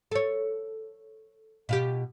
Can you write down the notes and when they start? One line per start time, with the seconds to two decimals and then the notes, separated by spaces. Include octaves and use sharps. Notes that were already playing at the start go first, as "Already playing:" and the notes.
0.11 A4 C#5
1.69 B2 F4 G4